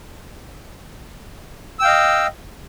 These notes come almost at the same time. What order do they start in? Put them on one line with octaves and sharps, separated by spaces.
E6 G5 F5 D#5